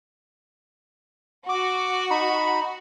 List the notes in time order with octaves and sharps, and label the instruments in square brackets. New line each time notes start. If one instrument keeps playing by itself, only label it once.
[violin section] F#4 [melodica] D6
[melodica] D#4 B5